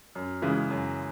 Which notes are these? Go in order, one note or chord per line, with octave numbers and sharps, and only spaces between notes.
F#2
C#3 E3 G#3
F#2